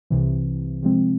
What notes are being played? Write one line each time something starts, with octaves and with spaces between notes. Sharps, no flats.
C2 C3 E3
C3 F3 G#3 C4